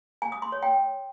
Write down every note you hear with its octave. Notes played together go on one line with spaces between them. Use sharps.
G#5
D#6
C6
C#5
G5